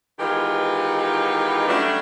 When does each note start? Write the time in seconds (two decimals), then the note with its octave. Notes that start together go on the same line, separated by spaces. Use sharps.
0.20 D#3 E3 G#3 B3 F4 G4
1.68 F#3 G3 A3 C#4 D4